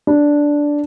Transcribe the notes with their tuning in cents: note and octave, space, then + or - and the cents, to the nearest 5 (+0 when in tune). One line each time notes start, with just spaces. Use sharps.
D4 -5